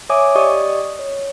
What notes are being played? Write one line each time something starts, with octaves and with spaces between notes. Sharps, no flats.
C#5 E5 G#5 D6 D#6
G4 D5 D#5 C#6 D#6
C#5